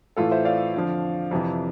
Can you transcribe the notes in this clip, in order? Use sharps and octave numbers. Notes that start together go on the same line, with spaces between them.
A2 E3 F4 A4
C5 E5
D5 F5
F2 D3 F3
F2 C3 E3